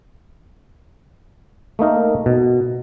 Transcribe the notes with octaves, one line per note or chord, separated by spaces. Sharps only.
A3 A#3 D#4 A#4
B2